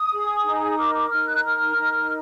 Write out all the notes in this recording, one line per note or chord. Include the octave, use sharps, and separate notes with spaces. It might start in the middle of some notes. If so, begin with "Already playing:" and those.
Already playing: D#6
G#4
D#4
A#4 D6
D6
D#4 F6
F#6
A#4 F6
D#4